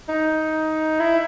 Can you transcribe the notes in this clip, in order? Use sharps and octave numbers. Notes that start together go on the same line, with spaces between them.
D#4
E4